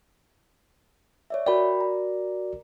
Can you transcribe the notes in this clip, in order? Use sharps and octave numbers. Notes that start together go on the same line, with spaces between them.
C#5 D5 E5
F#4 A#4 D5 G5 B5
A#5